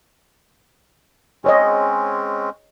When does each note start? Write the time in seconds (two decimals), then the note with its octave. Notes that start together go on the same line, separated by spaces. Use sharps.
1.44 G#3 C4 C#4 G#4 C#5 D#5